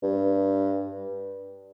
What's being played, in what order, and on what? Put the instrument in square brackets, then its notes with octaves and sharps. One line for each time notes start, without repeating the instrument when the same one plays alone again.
[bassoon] G2